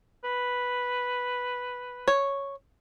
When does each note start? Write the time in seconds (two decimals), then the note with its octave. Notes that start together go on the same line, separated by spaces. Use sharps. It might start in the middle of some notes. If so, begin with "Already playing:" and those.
0.24 B4
2.08 C#5